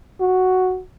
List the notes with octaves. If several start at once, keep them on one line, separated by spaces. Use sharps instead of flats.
F#4